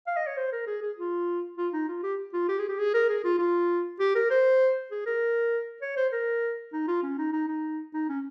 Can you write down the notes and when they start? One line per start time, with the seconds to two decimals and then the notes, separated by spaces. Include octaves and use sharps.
0.07 F5
0.16 D#5
0.27 C#5
0.37 C5
0.52 A#4
0.67 G#4
0.82 G#4
0.97 F4
1.57 F4
1.73 D#4
1.88 F4
2.03 G4
2.33 F4
2.49 G4
2.59 G#4
2.69 G4
2.79 G#4
2.94 A#4
3.09 G#4
3.24 F4
3.39 F4
4.00 G4
4.15 A#4
4.30 C5
4.91 G#4
5.06 A#4
5.82 C#5
5.97 C5
6.12 A#4
6.73 D#4
6.88 F4
7.03 C#4
7.18 D#4
7.33 D#4
7.48 D#4
7.94 D#4
8.09 C#4